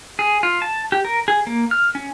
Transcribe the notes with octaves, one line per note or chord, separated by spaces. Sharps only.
G#4
F4
A5
G4
A#4
G#4
A#3
F6
C#4